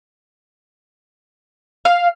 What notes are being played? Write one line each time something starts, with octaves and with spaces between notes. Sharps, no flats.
F5